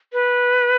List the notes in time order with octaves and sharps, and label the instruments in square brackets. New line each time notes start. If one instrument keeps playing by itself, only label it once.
[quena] B4